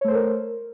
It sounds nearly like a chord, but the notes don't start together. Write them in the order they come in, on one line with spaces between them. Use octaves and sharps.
C#5 A3 C5 A4 A#4